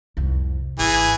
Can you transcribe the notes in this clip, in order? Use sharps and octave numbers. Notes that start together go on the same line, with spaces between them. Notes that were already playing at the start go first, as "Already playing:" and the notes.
C2 F2
G#1 E3 G#4